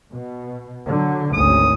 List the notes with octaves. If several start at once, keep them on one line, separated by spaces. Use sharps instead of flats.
B2
D3 F#3
G#1 D2 C#4 D#6